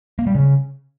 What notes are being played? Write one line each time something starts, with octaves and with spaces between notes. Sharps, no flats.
A#3
G3
C#3